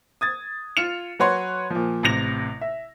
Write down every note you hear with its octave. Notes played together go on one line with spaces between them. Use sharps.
D#6 G#6 A6
F4 C#7 E7 F7
F#3 F#4 B4 C#5 C6
A#2 F3
A1 C3 A#6 F7
E5